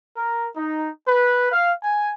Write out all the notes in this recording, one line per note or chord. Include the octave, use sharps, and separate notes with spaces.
A#4
D#4
B4
F5
G#5